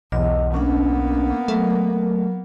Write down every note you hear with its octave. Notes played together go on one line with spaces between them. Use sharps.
B1 E2 D#5
A#3 B3 C#4 D4 F#5
F#3 A3 A#4